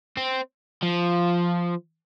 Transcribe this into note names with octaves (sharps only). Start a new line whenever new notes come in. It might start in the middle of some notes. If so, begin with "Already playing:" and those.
C4
F3